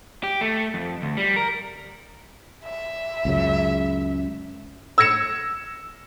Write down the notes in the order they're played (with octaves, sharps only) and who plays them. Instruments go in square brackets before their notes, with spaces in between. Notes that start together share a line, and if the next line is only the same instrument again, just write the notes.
[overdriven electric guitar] G4
A3
F2
D2
G3
A#4
[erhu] E5
[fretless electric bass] C#2 F#2 C#3
[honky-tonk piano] E6 G#6 A#6 C#7 E7